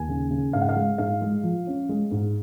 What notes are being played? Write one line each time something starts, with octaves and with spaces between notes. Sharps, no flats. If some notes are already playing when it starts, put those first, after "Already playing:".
Already playing: D#2 G#5
C#3
C#3
G#2 F5
F#5
F5
G#3
G#2 F5
G#3
F3
C#4
G#3
G#2